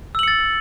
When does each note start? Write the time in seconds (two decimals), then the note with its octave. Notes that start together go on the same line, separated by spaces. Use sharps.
0.15 E6
0.19 F#7
0.23 C#7
0.28 A6